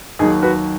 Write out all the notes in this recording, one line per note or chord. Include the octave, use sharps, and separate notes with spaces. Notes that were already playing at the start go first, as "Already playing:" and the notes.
D#2 D#3 F#3 D#4 G#4
F#4 B4